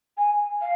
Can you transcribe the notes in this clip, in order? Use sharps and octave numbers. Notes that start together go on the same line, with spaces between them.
G#5
F5